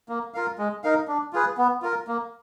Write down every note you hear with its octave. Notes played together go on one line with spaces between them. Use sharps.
A#3
F4 A#4 F5
G#3
D#4 A#4 F5
D4
F4 G#4 B4
B3
F4 A#4
A#3